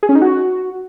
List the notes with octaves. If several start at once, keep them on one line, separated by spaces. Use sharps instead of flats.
G#4
C#4
D#4
F#4